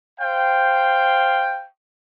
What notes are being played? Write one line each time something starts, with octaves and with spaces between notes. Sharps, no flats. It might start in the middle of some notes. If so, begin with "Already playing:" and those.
C5 F5 G5